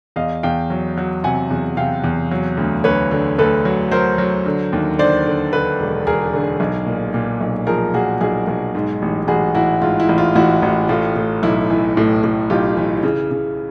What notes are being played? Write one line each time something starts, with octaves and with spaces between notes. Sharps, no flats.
E2 D#5 F5
E2 F5 G5
F#3
F#3
C3 F#5 G#5
E2
C3 F5 G5
E2
F#3
D2
D2 B4 C#5
D3
D2 A4 B4
F#3
F#3 A#4 C5
F#3
D3
D#2
D3 C5 D5
D3
D3 A4 B4
E1
E1 G#4 A#4
D3
B1
A#2
A#2
B1
F3 G#4 A#4
A#2 F#4 G#4
B1 F#4 G#4
B1
G#2
A1
A1 F#4 G#4
A1 E4 F#4
G#2 F4
E4
A1
F4
A1 E4 F#4
A1
A2 F4
A2
B1 E4
E3
A2
A2
B1 F4 G4
E3
C#3
C#3